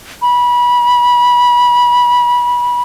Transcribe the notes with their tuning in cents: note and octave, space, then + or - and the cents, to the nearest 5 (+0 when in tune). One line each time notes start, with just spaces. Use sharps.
B5 -25